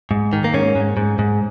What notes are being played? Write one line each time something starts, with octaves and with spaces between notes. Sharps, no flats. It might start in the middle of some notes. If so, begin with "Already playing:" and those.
G#2
D#3
A#3
G#2 C#4
G#2
G#2
G#2